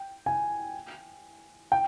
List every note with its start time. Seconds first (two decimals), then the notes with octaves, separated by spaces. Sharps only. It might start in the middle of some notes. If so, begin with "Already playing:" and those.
Already playing: G5
0.26 G#5
1.72 G5